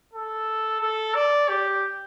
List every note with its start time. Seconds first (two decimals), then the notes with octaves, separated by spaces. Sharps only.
0.13 A4
0.81 A4
1.15 D5
1.49 G4